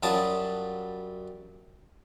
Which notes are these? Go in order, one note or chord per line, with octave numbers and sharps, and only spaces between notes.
F#2 F#3 G3 F4 A5 D#6